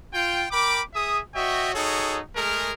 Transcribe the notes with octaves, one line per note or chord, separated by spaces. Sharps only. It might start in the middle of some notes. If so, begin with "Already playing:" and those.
F4 G5
A#4 G5 B5 D6
G#4 E5 D#6
F#4 C#5 D#5 E5 G5
D#4 F#4 G#4 A4 C#5
G#3 A3 G#4 A#4